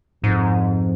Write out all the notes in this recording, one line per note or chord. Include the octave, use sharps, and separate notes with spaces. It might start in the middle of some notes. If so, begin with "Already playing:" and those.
F2 G#2